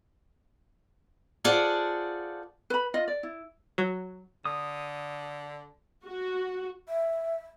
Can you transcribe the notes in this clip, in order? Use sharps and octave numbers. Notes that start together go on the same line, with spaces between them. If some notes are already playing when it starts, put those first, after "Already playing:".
F4 G#4 A4 C5 D5 F#5
B4 B5
F4 D#5
D5
E4
F#3
D3 D#6
F#4
E5